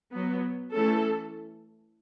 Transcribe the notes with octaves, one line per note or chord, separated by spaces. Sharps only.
F#3 B3
E3 A3 C#4 A4